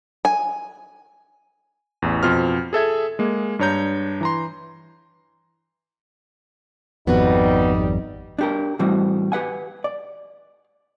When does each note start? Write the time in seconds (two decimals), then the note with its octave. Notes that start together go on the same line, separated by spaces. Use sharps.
0.25 G#5
2.02 A1 E2
2.23 F2 B2 F4 C5 F6
2.73 G#4 A4 E5 G#6
3.19 G#3 A#3
3.59 G2 D4 C#5 A#5 G6
4.21 E3 A#5 C6
7.07 G#1 F2 G3 B3 D#4 F#4 B4
8.39 D4 G4 A#4
8.79 A2 E3 G3 C4 F#4
9.32 G4 B4 F#5 G#5
9.84 D5